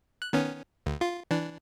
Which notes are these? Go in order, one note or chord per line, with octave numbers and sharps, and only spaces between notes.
F#6
D#3 B3 C#4
D2
F4
E3 D4